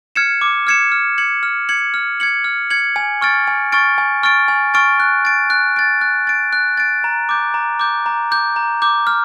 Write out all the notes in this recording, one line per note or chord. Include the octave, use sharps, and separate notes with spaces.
F6 G#6 C#7 E7
D6
F6 G#6 C#7 E7
F6
G#6 C#7 F#7
F6
G#6 C#7 F#7
F6
G#6 C#7 F#7
F6
G#6 C#7 F#7
G#5
C#6 F6 A6 D7
G#5
C#6 F6 A6 D7
G#5
C#6 F6 A6 D7
G#5
C#6 F6 A6 D7
F#6
A6 D7
F#6
A6 D7
F#6
A6 D7
F#6
A6 D7
A#5
D6 G6
A#5
D6 G6
A#5
D6 G6
A#5
D6 G6
F6